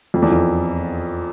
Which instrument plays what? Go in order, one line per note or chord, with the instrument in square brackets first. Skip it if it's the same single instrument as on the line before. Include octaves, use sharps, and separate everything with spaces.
[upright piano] F2
E2
F2